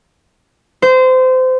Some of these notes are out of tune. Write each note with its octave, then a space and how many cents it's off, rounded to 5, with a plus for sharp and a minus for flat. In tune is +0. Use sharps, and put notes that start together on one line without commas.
C5 -25